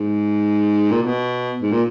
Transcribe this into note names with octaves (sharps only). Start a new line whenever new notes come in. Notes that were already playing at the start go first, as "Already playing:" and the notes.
Already playing: G#2
A#2
B2
G#2
A#2